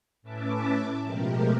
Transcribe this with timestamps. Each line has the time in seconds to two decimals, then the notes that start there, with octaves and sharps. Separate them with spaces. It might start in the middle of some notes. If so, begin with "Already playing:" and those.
0.22 A2 C#4 B4 E5 A5 D6
1.00 B2 F3 G#3 A3 G4 A#4